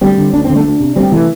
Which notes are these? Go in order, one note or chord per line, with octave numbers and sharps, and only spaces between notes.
D2 G3 C4
D3
D2 D4
D3 C4
A3 D4
D2
C3
D2 G3 C4
C3 E3 A3